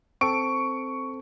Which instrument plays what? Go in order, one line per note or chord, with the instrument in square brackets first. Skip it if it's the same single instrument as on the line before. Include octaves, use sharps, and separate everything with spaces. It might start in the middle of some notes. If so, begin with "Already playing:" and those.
[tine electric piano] C4 A4 [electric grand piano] C#6 D7